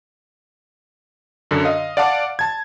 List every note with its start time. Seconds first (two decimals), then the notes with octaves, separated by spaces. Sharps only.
1.51 F#2 D3
1.65 D#5 F5
1.97 D5 F5 F#5 A5 D6
2.39 A5 G#6